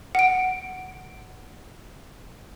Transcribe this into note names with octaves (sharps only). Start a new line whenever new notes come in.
F#5 D7